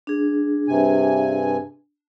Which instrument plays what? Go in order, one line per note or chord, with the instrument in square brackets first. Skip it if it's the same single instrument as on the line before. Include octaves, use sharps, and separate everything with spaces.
[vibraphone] D4 G#4
[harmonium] G2 C3 G#5